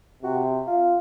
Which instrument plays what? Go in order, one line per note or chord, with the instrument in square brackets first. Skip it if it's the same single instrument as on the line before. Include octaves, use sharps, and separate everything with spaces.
[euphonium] C3 [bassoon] F#4
[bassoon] F4